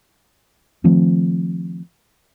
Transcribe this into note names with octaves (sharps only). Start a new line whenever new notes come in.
D#3 F3 A3 C4